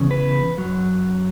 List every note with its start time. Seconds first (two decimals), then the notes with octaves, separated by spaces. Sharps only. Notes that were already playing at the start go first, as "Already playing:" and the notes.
Already playing: E2 C#3
0.11 B4
0.58 F#2 F#3